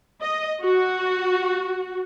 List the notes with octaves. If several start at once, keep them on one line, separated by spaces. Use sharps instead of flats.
D#5
F#4